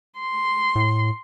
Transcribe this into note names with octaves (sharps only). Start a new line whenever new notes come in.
C6
A2